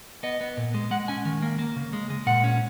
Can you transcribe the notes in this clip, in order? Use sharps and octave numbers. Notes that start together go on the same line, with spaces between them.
B3 D#5
B3
A#2
G#3
G#3 F#5
C#4 G#5
D#3
A#3
A#3
C#3
G#3
G#3
A#2 F#5
C#4